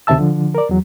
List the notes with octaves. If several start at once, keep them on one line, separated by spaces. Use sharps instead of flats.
D2 C3 D#3 E5 A5 E6
D3 F3
A#4 D5
E2 F#3